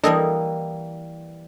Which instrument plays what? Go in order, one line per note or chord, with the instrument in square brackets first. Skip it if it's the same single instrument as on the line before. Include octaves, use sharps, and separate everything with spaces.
[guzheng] E3 G3 A#3 [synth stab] D4 A4 D#5